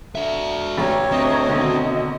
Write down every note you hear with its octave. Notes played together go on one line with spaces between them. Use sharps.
D3 F#4 E5
A1 C#5 A#5 C#6
D2 C4 D#5
B2 D3 D#3
D#5